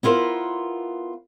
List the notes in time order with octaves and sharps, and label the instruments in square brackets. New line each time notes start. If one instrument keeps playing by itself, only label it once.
[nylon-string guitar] B3 E4 F4 A#4 C5